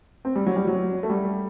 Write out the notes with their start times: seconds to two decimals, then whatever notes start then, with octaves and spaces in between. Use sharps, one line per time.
0.25 C4
0.36 G3
0.47 F#3
0.56 G3
0.67 F#3
1.03 A3
1.10 G3